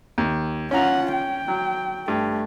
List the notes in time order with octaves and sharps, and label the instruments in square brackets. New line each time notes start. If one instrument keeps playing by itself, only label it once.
[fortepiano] D#2
[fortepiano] C#4 A#5 [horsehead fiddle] F4 F#5
[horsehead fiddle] G5
[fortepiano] F#3
[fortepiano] G2 [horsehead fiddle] A3